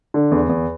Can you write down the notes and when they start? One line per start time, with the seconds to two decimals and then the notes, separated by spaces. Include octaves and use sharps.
0.14 D3
0.31 E2
0.49 E2